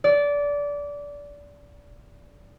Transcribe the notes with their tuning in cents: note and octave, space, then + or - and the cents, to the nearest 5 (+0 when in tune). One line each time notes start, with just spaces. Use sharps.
D5 -20